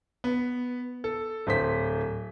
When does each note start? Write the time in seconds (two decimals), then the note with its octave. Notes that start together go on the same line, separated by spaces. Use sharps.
0.24 B3
1.04 A4
1.47 D1 C5 B6